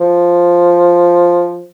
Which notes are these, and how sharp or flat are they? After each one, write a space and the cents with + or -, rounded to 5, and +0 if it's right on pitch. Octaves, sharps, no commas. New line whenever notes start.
F3 +0